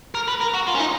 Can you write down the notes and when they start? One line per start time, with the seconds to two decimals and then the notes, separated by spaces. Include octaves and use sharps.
0.15 A#4
0.28 B4
0.40 A#4
0.54 F#4
0.67 F4
0.75 C#4
0.79 D#4